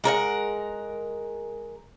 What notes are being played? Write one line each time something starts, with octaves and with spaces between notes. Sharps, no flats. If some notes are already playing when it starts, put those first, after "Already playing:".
G#3 A#4 C5 F#5